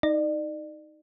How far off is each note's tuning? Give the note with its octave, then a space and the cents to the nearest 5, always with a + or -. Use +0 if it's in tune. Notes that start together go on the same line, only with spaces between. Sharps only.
D#4 +10 D5 +35